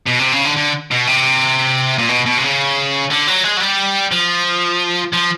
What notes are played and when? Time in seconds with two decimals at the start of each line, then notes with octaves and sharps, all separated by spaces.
0.07 B2
0.19 C3
0.32 C#3
0.45 D3
0.57 D3
0.92 B2
1.08 C3
1.98 A#2
2.09 B2
2.26 B2
2.38 C3
2.43 C#3
3.11 D3
3.27 F#3
3.44 G#3
3.57 F#3
3.60 G3
4.12 F3
5.13 F3